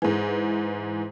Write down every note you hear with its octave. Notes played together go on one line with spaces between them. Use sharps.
G#2 E3